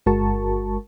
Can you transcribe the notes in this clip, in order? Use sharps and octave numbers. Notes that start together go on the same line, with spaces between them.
G1 G#3 F#4 A#4 A5 C#6